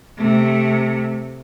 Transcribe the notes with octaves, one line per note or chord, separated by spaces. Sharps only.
C3 A3